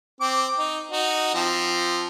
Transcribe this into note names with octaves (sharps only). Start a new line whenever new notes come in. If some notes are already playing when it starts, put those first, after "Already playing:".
C4 D6
D#4
D#4 F#4
F3 C4